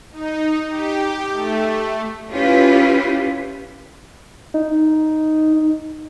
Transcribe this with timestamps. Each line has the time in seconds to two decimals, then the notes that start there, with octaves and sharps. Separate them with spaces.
0.12 D#4
0.70 G4
1.33 A3
2.31 C#4 E4 F4 G4 B4
4.54 D#4